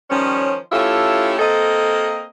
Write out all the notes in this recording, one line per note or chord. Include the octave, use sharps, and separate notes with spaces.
D#3 F3 G3 C#4
A3 C#4 E4 F4 G4 A4
A#3 C4 A4 D#5